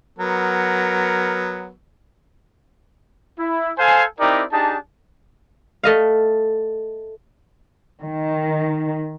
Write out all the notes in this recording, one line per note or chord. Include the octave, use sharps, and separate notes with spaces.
F#3 B3 A#4
E4
A4 C5 F5 G#5
C4 D#4 E4 G4 A#4 D5
D4 D#4 G4 G#4 A5
A3 D#5 F5
D#3